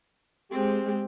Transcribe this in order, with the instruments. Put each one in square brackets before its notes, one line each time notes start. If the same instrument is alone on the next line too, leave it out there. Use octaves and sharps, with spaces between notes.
[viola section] G#3 [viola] C4 G4